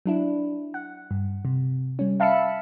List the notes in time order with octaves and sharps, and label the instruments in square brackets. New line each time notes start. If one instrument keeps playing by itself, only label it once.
[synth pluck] F#3 D4 E4
F#5
G2
C3
G3 C#4
E5 F5 A5 B5 E6 C#7